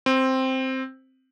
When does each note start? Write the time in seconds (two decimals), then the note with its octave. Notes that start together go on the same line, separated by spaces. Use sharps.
0.06 C4